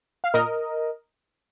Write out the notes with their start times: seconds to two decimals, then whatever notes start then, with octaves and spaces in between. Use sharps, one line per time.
0.24 F5
0.34 A#2 A#4 D#5